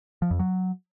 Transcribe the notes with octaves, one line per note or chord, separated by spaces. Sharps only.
F3
F2
F#3